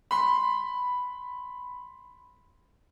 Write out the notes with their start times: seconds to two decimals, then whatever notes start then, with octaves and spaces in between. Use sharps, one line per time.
0.11 B5 C6